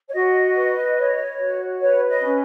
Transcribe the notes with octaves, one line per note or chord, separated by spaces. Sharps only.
C#5
F#4 D#5
B4
C#5
F#4
B4 C#5
D#5
C#4